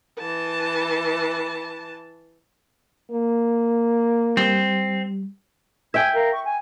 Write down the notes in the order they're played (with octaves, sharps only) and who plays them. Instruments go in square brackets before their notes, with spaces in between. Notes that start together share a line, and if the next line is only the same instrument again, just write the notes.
[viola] E3 A5
[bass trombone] A#3
[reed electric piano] G3 [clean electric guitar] C4
[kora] E5 G5 [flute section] G#5 G#6
[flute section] A#4 F5
C#6
G#5